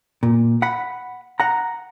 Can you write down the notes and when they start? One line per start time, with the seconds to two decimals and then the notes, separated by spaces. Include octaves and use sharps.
0.23 A#2
0.62 F#5 B5
1.40 F#5 A#5